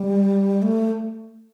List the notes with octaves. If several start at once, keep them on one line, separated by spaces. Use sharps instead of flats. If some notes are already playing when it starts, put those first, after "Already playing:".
Already playing: G3
A3